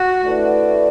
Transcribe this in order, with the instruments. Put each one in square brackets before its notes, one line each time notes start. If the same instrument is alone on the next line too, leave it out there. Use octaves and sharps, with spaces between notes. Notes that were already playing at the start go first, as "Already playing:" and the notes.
Already playing: [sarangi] F#4
[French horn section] D3 A3 E4 B4 D5